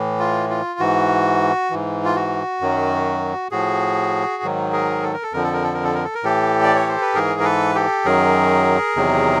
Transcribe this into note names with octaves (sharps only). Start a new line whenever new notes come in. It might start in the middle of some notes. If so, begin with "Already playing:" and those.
Already playing: A2 E3
F4
F4
G#2 E3 F#4
G#2 E3
F4
F#4
F#2 D#3 F#3
A2 F3 F#4 G#4
G#2 D#3 F#3
G#4 A#4
A4
A#4
A4
F2 D3 F3 A#4
A4
A#4
A4
A#4
A4
A#4
A4
A#4
A2 E3 G4 A4
D5
C#5
C5
B4
G#2 E3 G#4 A#4
A#4
A4 B4
G4 A4
F#2 D#3 F#3 G#4 A#4
E2 C3 D#3 F#3